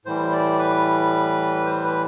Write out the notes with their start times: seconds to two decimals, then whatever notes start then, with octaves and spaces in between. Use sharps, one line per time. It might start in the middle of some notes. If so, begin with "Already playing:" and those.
0.05 A2 E3 G3 C5
0.33 D5
0.59 B4
1.66 C5
1.84 B4